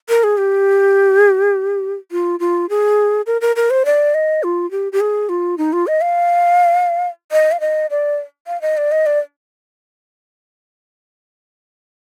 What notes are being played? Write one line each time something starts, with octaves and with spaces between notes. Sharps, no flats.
A#4
G#4
G4
F4
F4
G#4
A#4
A#4
A#4
C5
D5
D#5
F4
G4
G4
G#4
F4
D#4
F4
D#5
F5
D#5
F5
D#5
D5
F5
D#5
D5
D#5
D5